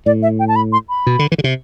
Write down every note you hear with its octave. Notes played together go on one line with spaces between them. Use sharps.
A2 D5
E5
G5
A5
B5
C6
B5
B2
D3
E3
D3
C3